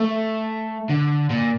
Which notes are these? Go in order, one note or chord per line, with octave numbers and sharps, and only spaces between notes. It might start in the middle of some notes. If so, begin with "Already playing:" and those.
Already playing: A3
D3
A#2